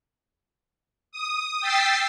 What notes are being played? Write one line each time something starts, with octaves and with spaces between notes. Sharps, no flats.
D#6
G5 E6 A6 B6 C7